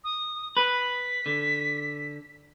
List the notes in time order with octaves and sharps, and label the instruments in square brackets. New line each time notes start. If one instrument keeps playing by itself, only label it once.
[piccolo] D#6
[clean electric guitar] B4 [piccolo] B6
[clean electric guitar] D3